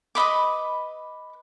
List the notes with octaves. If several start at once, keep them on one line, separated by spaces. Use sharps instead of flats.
B4 D#5 B5 D6